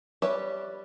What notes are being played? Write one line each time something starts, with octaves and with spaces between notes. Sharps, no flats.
G3 G4 B4 C#5 E5